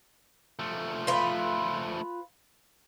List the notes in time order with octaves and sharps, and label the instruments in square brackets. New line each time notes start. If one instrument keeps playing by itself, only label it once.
[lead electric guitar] F3 A3
[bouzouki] F4 B4